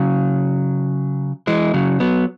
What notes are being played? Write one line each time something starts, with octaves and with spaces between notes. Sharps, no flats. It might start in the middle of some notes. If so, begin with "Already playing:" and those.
Already playing: C#3 F#3
E3 G#3
C#3 F#3
F#3 B3